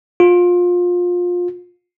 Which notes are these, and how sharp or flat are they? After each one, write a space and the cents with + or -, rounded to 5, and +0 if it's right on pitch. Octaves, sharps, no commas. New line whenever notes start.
F4 +25